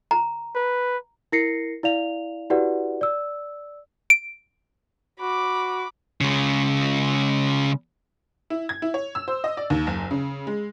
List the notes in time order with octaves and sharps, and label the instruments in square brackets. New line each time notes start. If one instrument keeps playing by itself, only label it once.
[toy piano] A#5
[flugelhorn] B4
[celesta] E4 A#4 A#6 C7 C#7
E4 D5 F5 F7
E4 F#4 G4 B4 D5 F#5
D5 E6
[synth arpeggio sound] D7
[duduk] F#4 [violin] B5 D6
[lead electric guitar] C#3 G#3
[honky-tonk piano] E4
G#6
E4
C#5
E6
C5
D#5
D5
D#2
F#1
C#3
G#3